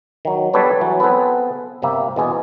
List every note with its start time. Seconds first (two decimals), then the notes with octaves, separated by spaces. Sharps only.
0.25 D#3 F#3
0.54 G3 B3 D4 A4 B4 C#5
0.81 E3 F#3
1.00 B3 C4 G#4 A4 B4
1.82 G1 C3 G3 A#3 E5
2.16 E2 B2 G#4 D#5